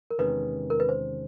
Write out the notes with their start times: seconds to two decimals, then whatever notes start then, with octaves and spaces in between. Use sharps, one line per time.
0.11 A#4
0.18 E2 C3 D#3 G#3 C#4 B4
0.70 A#4
0.80 B4
0.89 C5